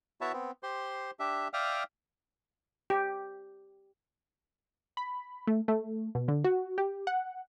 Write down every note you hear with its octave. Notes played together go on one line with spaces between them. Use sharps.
B3 E4 F#4 C#5 E5 A5
B3 C4
G4 C5 C6
D4 G4 E5
D5 E5 F5 G5 D#6 F6
G4
B5
A3
A3
B2
D3
F#4
G4
F#5